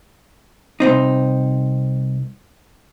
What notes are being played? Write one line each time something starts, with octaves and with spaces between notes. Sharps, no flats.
C2 C4 D#4